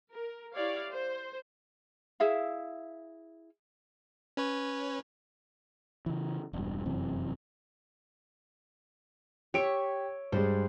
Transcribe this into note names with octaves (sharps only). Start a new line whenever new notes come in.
A#4
E4 G4 C#5 D5 F5
C5
E4 G#4 E5 F5
C#4 B4 C#5
C#3 E3
E1 G2
F1 F#2 C3 E3
G4 C#5 E5 C#6 D7
G2 G3 G#3 C5